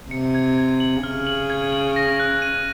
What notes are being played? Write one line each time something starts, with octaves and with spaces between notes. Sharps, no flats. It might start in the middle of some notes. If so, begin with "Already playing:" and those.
C3 C#7
G#6
G#6
F#7
C#3 F6
F#7
G#6
F#7
A#6
F#6
D#7